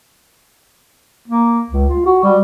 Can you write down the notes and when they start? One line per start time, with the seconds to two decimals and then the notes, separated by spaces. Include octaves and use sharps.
1.28 A#3
1.70 C#2
1.90 F4
2.06 F#4
2.23 G3